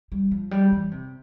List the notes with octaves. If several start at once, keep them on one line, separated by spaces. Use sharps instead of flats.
G3
F3
G3
E3
C3